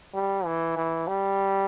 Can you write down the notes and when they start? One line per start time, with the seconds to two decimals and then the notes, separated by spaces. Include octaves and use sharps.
0.14 G3
0.45 E3
0.77 E3
1.07 G3